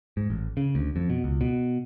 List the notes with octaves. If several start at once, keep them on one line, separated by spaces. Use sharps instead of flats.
G#2
A1
C#3
D2
F2
B2
C#2
B2